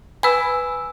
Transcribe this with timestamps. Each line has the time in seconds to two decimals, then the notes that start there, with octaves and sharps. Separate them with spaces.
0.23 B4 G#5 B5 E6